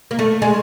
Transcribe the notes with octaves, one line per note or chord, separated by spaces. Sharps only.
A#3
A3
G#3